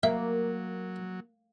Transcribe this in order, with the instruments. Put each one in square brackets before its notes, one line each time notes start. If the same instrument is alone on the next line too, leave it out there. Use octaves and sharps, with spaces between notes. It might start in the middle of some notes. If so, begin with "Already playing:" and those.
[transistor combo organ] F#3 [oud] A#3 [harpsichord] E5